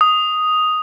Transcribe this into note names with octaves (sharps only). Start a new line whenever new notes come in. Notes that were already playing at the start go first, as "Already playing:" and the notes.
D#6